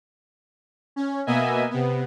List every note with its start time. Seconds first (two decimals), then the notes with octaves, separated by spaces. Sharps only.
0.96 C#4
1.26 B2 A#3 B3 D#5 E5 G#5
1.71 C3 B3